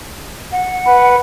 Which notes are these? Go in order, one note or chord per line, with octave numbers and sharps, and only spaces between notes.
F#5
B4